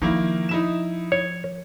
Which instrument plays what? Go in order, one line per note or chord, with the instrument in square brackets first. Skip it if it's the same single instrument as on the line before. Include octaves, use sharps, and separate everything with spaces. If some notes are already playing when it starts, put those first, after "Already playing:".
[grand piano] D#3 A#3 E4 [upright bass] F3
[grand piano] D#4 E4 E7
[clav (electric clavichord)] C#5